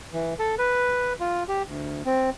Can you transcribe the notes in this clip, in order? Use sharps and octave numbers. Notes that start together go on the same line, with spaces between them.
E3
A4
B4
F4
G4
D2
C4